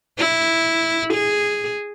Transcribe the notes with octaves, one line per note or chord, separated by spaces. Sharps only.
E4
G#4